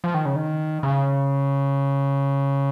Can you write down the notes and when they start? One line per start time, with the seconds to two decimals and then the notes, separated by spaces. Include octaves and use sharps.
0.04 F3
0.14 D#3
0.25 C#3
0.36 D#3
0.83 C#3